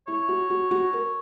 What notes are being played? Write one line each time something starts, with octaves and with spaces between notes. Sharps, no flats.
E4 C#5
F#4
F#4
F#4
A#4